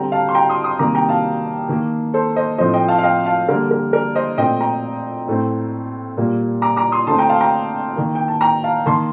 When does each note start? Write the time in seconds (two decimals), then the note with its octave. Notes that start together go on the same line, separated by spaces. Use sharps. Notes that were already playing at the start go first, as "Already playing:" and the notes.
Already playing: D3 G3 C4 G5 A#5
0.12 F5 A5
0.29 C6
0.35 G5 A#5
0.49 C6 D#6
0.64 C6 D#6
0.79 C3 D#3 G3 A#3 A#5 D6
0.95 G5 A#5
1.09 F5 A5
1.69 D#3 A#3
2.14 A4 C5
2.36 C5 D#5
2.58 A2 F3 A3 C4 C5 D#5
2.73 D#5 G5
2.88 F5 A5
2.99 F5
3.03 D#5 G5
3.26 F5 A5
3.48 D3 G3 A#3 A#4
3.71 A#4
3.93 A#4 D5
4.15 C5 D#5
4.38 A#2 A3 C4 D#5 G5
4.61 G5 A#5
5.28 A2 A3 C4
6.17 A#2 G3 A#3
6.62 A#5 D6
6.76 A#5 D6
6.92 C6 D#6
7.07 D3 A3 C4 A5 C6
7.18 G5 A#5
7.29 F5 A5
7.40 G5 A#5
7.96 D#3 A#3
8.15 G5
8.28 A5
8.41 G5 A#5
8.64 F5 A5
8.86 D#3 A#3 A5 C6